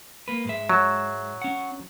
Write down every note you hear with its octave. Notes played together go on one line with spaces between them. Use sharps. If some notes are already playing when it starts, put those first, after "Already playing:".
A#3 B4
G#2 G#3 E5
F#3
C#4 F#5